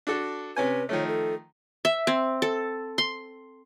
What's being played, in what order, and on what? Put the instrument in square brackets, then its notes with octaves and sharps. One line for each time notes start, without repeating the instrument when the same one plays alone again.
[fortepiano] D4 F#4 A4
[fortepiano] C3 C#4 G#5 [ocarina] B4
[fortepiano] D#3 F3 A3 [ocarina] C#5
[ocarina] A4
[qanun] E5
C4
A4
C6